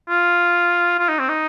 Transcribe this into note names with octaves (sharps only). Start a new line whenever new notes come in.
F4
F4
D#4
C4
D#4